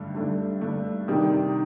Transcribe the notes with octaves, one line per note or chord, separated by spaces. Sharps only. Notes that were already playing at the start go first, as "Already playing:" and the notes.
Already playing: G2 D3 A3 D4
G2 D3 A3 D4
G2 D3 A3 D4
C3 D#3 G3 D4 G4